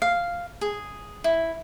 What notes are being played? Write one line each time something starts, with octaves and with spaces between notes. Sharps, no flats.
F5
G#4
E4